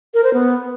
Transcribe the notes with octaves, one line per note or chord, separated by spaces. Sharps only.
A#4
C5
B3